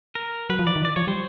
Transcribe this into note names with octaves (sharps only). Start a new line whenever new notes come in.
A#4
F#3 B4
F3
E3 D5
D#3
E3 D5
F3 C#5
G3 C5